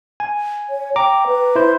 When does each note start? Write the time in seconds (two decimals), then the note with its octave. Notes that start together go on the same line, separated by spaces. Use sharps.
0.20 G#5
0.70 C#5
0.96 G5 A#5 D6
1.27 B4
1.56 E4 C5